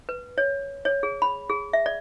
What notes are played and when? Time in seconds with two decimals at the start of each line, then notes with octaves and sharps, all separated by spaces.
0.09 B4
0.38 C#5
0.85 C#5
1.03 G#4
1.22 B5
1.50 G#4
1.73 E5
1.86 D5